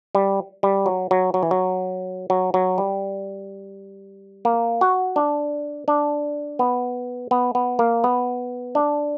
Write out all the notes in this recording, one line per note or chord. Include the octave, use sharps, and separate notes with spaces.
G3
G3
F#3
F#3
F#3
E3
F#3
F#3
F#3
G3
A#3
F#4
D4
D4
B3
B3
B3
A#3
B3
D4